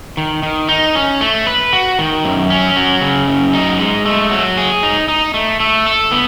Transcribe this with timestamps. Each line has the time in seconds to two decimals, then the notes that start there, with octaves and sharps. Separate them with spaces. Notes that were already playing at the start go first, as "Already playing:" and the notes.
0.17 D#3
0.43 D#3
0.69 D#4
0.95 C#4
1.21 A3
1.47 B4
1.73 F#4
1.99 D#3
2.25 F#2
2.50 C#4
2.76 F#3
3.01 C#3
3.28 F#2
3.53 D#4
3.79 G#3
4.06 A3
4.31 F#3
4.57 G#4
4.83 D#4
5.08 D#4
5.34 A3
5.60 A3
5.86 A4
6.12 B3